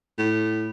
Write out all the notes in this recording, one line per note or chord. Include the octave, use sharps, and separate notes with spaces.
A2